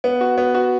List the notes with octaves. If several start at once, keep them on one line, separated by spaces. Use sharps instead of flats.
B3
F#4
B3
F#4